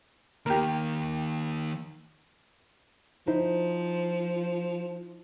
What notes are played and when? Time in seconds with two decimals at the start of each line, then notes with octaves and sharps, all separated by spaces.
0.46 D#3 A#3 G4 A#4
3.27 F3 D#4 E4 C5